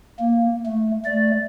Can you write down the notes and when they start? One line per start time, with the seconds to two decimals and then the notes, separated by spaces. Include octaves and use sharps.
0.19 A#3
0.66 A3
1.05 A3 D5